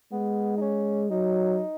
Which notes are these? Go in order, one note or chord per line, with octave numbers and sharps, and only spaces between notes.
G#3 B3
D#4
C#4
F#3 D#4